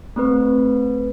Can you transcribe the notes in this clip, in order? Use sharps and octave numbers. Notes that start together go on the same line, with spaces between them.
A3 C4 B4